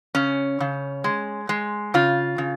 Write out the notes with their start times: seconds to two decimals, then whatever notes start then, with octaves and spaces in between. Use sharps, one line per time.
0.15 C#3 C#4
0.60 C#3
1.04 G#3
1.49 G#3
1.94 C#3 F4
2.38 C#3